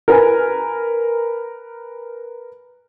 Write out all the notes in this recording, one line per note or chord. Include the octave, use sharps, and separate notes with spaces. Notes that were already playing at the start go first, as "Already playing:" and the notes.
A#4 B4 G#5